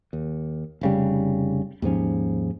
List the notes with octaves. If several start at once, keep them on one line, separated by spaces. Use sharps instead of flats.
D#2
F1 C#3 G3
D#2 G#2 F3 C#4